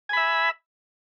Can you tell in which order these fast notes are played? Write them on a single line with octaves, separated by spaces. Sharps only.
G#5 B5 E5